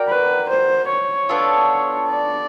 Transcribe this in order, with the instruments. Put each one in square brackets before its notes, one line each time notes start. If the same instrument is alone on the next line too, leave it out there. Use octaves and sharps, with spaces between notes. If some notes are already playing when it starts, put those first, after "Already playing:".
Already playing: [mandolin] F#4 A#4 D5 G5
[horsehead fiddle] B4
C5
C#5
[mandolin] B3 D4 F4 A4
[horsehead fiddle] D5